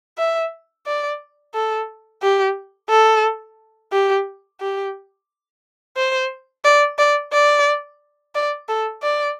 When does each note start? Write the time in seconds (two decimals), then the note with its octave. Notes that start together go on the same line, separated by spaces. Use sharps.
0.18 E5
0.86 D5
1.54 A4
2.22 G4
2.90 A4
3.92 G4
4.61 G4
5.96 C5
6.64 D5
6.98 D5
7.33 D5
8.35 D5
8.69 A4
9.03 D5